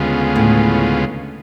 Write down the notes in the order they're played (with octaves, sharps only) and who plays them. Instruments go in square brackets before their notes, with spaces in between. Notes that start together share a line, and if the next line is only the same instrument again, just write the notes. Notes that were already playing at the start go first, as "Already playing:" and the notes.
Already playing: [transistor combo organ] D2 C#3 G#3 B3 F4
[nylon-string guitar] A2